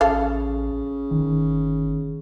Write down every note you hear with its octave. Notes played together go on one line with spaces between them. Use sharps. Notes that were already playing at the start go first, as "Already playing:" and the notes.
A1 C#3 A4 F5
G1 D#3